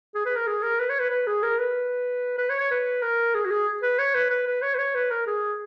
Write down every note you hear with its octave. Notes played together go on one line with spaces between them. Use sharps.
G#4
B4
A#4
G#4
A#4
B4
C#5
B4
B4
G#4
A#4
B4
B4
C#5
C#5
B4
A#4
G#4
F#4
G#4
B4
C#5
B4
B4
B4
C#5
B4
C#5
B4
A#4
G#4